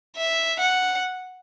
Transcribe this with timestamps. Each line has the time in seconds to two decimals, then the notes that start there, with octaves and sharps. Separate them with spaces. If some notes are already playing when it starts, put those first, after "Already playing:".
0.17 E5
0.60 F#5